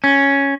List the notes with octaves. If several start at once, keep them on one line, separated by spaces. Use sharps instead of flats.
C#4